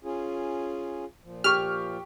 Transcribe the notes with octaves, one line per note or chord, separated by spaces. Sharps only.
C#4 F4 G#4
A#2 F3
G4 C#6 F6